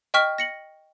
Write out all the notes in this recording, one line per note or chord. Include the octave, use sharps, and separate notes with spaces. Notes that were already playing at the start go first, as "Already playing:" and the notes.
D#5 G5 C#6 F6 B6
A#6 C#7 F#7